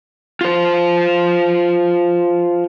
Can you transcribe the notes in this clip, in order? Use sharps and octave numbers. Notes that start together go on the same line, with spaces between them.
F4 C5